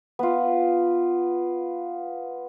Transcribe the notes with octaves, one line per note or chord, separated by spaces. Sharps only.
B3 F4